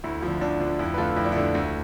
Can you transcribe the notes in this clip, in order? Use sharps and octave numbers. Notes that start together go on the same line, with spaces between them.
D2 E4
D3 F3
D2 D4
D3 F3
F2 E4
B4
D3 A3 F4 A4
F2 E4
D4
D3 A3 E4
D2